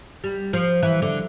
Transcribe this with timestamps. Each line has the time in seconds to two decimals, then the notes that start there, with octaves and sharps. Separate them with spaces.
0.24 G3
0.53 F3
0.83 E3
1.02 D3